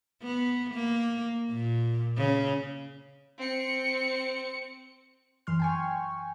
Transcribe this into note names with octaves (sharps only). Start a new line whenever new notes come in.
B3
A#3
A#2
C#3
C4 C#7
F#2 E3 C6 F6
G5 G#5 C#6